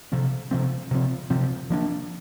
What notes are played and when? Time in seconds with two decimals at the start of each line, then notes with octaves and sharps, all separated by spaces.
0.12 C3 F3 C4
0.51 C3 F3 C4
0.91 C3 F3 C4
1.30 C3 F3 C4
1.70 F3 A#3 D4